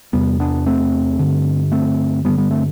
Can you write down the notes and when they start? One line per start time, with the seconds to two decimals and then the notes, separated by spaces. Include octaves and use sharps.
0.13 E2 C3 G3 B3
0.40 B3 D4
0.66 A3 C4
1.19 G2 D3
1.72 A3 C4
2.25 G2 D3 G3 B3
2.38 G3 B3
2.51 A3 C4